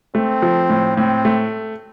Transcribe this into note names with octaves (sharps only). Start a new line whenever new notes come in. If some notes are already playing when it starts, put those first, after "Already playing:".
A3 C4
F3
A2
A2 C4
A3